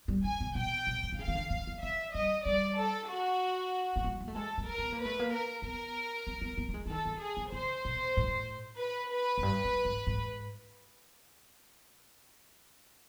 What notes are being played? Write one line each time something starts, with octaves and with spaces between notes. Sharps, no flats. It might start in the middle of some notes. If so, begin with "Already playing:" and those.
G3
D3 G#5
C3
B2 G5
B2
C#3
D3
C#3 F5
D#3
D3
D3
D#3
F3 E5
G3 D#5
G3 D5
A4
F#4
A3
G#3
A#3
A3
G#3 A4
A3
A#4
B3
A#3
B4
A3
A#3
A#4
B3 A#4
C4
B3
A#3
A3
G#3
E3
D#3 A4
D3
G#4
D3
C#3 C5
B2
A2
B4
B4
F#2
G2
G2
G#2
G#2